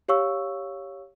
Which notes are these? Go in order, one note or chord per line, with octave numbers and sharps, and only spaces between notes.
G4 C#5 F5 C#6 E6